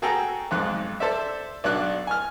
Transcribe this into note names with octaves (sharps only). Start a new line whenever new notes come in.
F#4 G#4 A4 G5 A#5
B1 F2 G#2 F#6
A4 C5 D5 E5
B1 D4 F#4 D5 F#6
G#5 F6